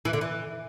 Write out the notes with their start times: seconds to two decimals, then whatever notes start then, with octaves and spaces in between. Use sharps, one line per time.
0.05 E3
0.13 D3
0.21 E3